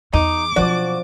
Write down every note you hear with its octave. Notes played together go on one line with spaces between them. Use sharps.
E2 D#4 D6
B2 F3 F#3 F#4 D5